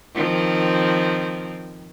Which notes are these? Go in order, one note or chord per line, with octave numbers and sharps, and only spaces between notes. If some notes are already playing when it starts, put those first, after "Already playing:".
D#3 F3 C4